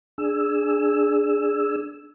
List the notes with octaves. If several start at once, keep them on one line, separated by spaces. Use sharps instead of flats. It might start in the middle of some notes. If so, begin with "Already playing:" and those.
D4 G#4 E6